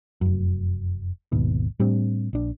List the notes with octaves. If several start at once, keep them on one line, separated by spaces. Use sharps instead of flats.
F1 F#2
G#1 D#2 B2
A2 G3 C4 D4
A#1 D4